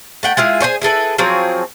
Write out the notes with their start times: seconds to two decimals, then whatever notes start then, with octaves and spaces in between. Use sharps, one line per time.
0.23 A3 F#5 G5
0.37 G#3 E4 F4 G#4
0.60 G#4 C5 C#5 G#5
0.82 E4 G#4 A4 B4
1.18 F3 F#3 C4 G#4